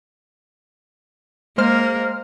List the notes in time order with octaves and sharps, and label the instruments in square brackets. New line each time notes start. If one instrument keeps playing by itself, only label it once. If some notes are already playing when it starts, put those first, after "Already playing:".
[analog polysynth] G#3 C5 F6 [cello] A#3